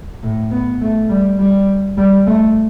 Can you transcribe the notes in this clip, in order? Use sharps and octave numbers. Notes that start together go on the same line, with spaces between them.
A2
B3
A3
G3
G3
G3
A3